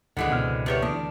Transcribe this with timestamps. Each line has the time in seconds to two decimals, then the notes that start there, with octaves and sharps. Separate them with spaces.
0.17 C#2 G#2 D3 E3 G#3 F#5
0.30 B2 C4 F6
0.66 E2 G3 G#4 B4 C#5
0.82 D2 E3 D4 E4